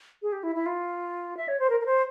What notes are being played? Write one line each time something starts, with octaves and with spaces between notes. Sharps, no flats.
G#4
G4
E4
E4
F4
E5
C#5
C5
A#4
A#4
C5